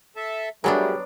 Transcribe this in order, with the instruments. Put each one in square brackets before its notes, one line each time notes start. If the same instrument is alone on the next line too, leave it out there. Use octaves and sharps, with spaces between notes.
[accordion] A4 E5 A5
[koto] F#3 B3 D4 [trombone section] G3 [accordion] A3 [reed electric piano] F#4 G#4 A#4